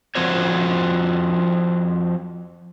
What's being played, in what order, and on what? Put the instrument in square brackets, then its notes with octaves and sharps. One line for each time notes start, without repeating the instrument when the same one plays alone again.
[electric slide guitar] F3 C4 F#4 C#5